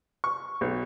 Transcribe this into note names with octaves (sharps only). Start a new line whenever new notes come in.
C#6
B1